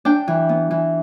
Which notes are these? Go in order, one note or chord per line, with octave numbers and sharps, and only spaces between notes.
D4 G5
E3
B3
E3